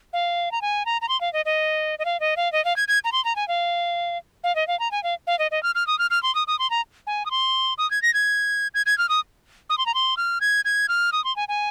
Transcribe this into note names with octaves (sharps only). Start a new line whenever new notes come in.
F5
A#5
G#5
A#5
A#5
C6
F5
D#5
D#5
D#5
F5
D#5
F5
D#5
F5
G#6
G#6
A#5
C6
A#5
G#5
F5
F5
D#5
F5
A#5
G#5
F5
F5
D#5
D#5
F6
F6
D#6
F6
F6
C6
D#6
D#6
C6
A#5
G#5
D#6
C6
D#6
G#6
A#6
G#6
G#6
G#6
F6
D#6
D#6
C6
A#5
C6
F6
G#6
G#6
F6
D#6
C6
G#5
G#5